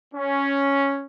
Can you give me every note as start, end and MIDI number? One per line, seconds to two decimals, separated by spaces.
0.14 1.06 61